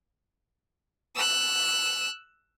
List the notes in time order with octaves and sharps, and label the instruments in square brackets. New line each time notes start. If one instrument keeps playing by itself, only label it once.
[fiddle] E6 F#6